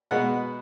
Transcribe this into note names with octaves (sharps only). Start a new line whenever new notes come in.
B2 G#3 B3 F#5